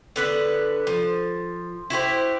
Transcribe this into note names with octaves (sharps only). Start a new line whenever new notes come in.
D3 B3 B4
F3
E4 F#4 G4 C5